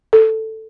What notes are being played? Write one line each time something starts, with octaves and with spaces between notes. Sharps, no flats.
A4